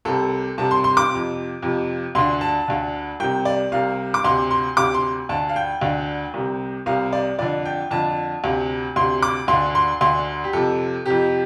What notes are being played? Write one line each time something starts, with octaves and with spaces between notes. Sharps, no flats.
C2 C3 A4
C2 C3 A5
C6
C6
D6
F2 C3
F2 C3
D2 D3 C6
A5
D2 D3
C2 C3 G5
D5
C2 C3 F5
D6
D2 C3 C6
C6
D2 C3 D6
C6
D2 D3 A5
F5
G5
D2 D3
C2 C3
C2 C3 F5
D5
F2 D3 D5
G5
F2 D3 A5
D2 C3
D2 C3 C6
D6
D2 D3 C6
C6
D2 D3 C6
G4
F2 C3 A4
F2 C3 G4